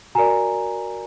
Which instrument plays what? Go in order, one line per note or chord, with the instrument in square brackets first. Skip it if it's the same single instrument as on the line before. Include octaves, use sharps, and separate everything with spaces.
[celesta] F#4 A#4 D5 G#5 A#5